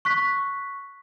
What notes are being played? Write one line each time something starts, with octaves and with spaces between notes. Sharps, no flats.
C#6 F#6 B6